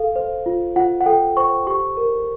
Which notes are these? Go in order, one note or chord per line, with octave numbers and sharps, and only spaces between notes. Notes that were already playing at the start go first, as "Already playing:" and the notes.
Already playing: A4 F5
C5
F4
F4 F#5
F#5
A4 G5
C5 C#6
G4 C#6
A#4